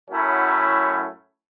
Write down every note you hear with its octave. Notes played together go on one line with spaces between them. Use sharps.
F#2 A2 F#3 A3 C#4 E4